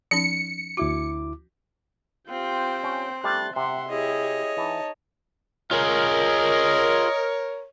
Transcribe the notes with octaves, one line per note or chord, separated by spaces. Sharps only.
F3 C#4 D#4 C#7
D2 E4 F#4 D6
C4 F4 G4 G5
C#4
G3 A3 G4 C6 F#6 A6
C3 E5 F#5 C6
E4 G4 G#4 C#5 D#5
E3 D#4 A5
F4 G#4 A#4 C#5 D#5